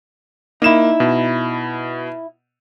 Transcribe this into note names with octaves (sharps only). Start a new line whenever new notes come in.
A#3 D#4 E4 E7
B2